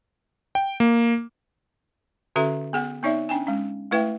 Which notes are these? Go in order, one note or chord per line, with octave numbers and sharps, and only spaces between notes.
G5
A#3
D3 C#4 F#4 A4 E5 A#5
B3 G#4 F#5
B3 C4 D#4 C#5 D5 E5
C#4 D4 G5 G#5
G#3 C#4
A3 E4 B4 E5 G5